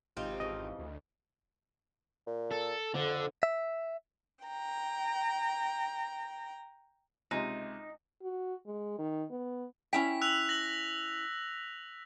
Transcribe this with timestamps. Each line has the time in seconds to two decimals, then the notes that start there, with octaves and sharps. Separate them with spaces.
0.17 G#1 C3 C4 D#4 F4
0.40 F2 C#3 E3 D#5
0.79 D2
2.27 A#2
2.51 A4
2.94 F2 D3
3.43 E5
4.45 G5 A#5
7.31 C#2 C3 G#3 D#4
8.22 F#4
8.66 G#3
8.99 D#3
9.31 B3
9.93 C#4 E4 G5 B6
10.21 E6 F#6 F7
10.49 A#6 F#7